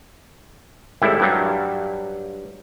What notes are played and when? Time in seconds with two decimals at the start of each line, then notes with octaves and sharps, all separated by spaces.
1.02 G#1 A2 G3 E4
1.20 G2 F#3 G3